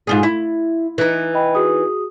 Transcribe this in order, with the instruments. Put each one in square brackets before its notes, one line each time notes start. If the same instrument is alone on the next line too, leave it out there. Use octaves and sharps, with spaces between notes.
[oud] G#2 F4 G#4
E4
E3 D#4
[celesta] D#5 G5 B5
F#4 G#4 D#6